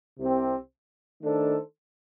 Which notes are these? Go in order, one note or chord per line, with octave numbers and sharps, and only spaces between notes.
C2 C3 G3 C4 G4
D#3 A3 D4 A4 C5